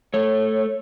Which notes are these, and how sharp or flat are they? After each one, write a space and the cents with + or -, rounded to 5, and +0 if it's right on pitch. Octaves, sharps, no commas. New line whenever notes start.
A3 +0 C#5 -20